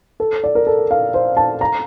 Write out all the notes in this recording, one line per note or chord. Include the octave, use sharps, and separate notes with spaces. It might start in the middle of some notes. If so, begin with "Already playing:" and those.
A4
D5
A#4
A4
F5
C5
A5
A#5